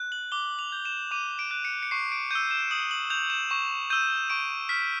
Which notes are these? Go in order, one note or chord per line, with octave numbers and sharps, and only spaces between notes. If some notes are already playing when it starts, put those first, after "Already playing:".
Already playing: F#6
F#7
D6 G7
F7
G6
E7
D6 D#7
D7
F#6
C#7
C#7
C#6 C7
D7
E6 G6 D#7
E7
D#6 F#7
F#7
G6 F7
E7
C#6 E7
E6 G6 D#7
C#6 D7
F6 B6